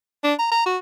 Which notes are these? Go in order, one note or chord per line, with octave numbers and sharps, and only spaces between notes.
D4
A#5
A#5
F#4